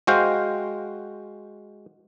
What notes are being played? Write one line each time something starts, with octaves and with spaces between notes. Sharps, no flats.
G#3 F#4 C5 F5 G5